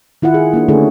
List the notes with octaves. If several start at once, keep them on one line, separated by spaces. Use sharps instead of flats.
D#3 E4 F4 F#5
G#4
A#3 D4 F#4
D3 A3 C#4 D#4 F#4 G#4